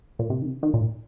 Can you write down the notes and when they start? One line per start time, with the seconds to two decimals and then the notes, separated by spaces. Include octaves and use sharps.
0.19 A#2
0.30 C3
0.42 D#3
0.46 C3
0.63 D#3
0.74 A#2